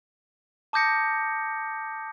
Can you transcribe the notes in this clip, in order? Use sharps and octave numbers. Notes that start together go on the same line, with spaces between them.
A5 D6 D#6 G6 A#6 C#7